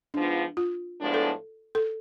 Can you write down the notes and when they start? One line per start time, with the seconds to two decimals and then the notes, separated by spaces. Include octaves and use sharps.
0.13 G#2 F3 B3 D4 F4
0.57 F4
1.00 A2 F3 G#3 B3 D4
1.14 A4
1.75 A4